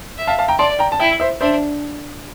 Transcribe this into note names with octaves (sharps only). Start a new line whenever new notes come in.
E5
F5 A5
F5 A5
G5 A#5
D5 A5 C6
G5 A#5
A5
E4 E5 G5
C5 E5
D4 C5 E5